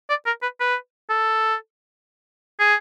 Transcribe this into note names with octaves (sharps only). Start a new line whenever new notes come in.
D5
A#4
B4
B4
A4
G#4